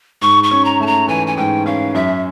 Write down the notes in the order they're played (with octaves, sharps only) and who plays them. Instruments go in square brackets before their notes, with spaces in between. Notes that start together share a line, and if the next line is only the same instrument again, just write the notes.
[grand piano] G#2 [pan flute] C#6
[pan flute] C#6
[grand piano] C#4
[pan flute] A#5
[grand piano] A3 [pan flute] A5
[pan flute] A#5
[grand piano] E3 [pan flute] G#5
[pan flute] G#5
[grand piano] G#2 [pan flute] G5
[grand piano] C#4 [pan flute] F5
[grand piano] F#2 [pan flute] E5